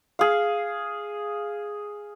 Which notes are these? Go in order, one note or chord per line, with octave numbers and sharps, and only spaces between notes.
G#4 F5